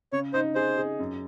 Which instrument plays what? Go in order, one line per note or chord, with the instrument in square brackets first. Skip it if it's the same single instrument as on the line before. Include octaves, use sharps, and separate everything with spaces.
[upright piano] C#3 [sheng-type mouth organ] C#5
[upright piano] D#4 [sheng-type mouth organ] C5
[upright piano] G#4 [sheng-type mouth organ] C5
[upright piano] G#4
F#2